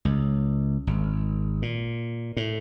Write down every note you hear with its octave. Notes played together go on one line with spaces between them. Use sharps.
C#2
G#1
A#2
A2